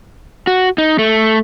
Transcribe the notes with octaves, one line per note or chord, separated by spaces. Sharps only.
F#4
D#4
A3